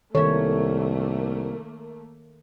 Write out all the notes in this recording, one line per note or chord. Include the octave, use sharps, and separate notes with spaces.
C2 D#3 A3 A#3 A4 C#5 E5